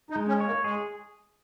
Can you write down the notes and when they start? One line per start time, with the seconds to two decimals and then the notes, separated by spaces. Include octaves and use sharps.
0.10 D#4
0.16 G#3
0.28 C#4
0.40 C#5
0.47 A#3
0.64 G#3 G#4